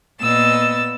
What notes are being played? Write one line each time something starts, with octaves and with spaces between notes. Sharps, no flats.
A#2 B3 D#5 E6 A6